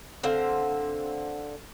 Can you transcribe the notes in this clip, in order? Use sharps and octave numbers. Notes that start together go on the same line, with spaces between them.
D3 C4 C5 F5